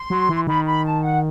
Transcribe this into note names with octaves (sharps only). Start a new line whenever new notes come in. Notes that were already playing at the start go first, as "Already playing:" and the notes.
Already playing: C6
F#3
E3
D#3 B5
B5
A5
F#5